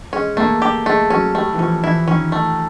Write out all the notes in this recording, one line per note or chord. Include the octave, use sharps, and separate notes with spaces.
G#3 C#4
A3 A#3
G4
G#3 A3
F#3 C#4
G3 A3
E3
F3 C#4
E3 E4
D#3 C#4
A3